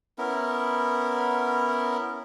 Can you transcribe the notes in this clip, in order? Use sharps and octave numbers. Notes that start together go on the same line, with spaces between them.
B3 C#4 E4 A#4